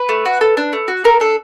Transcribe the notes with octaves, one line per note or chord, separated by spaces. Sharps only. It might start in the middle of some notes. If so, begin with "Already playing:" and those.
Already playing: B4
A3
F#4
A4
D4
A3
F#4
A4 A#4
D4 A4